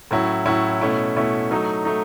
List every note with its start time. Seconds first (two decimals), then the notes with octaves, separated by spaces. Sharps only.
0.11 A2 F#3 C#4 E4
0.46 A2 F#3 C#4 E4
0.81 B2 A3 C#4 E4
1.17 B2 A3 C#4 E4
1.51 F#3 A3 D#4
1.85 A3 D#4